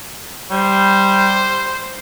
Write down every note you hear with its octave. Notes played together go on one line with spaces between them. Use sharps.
G3 C5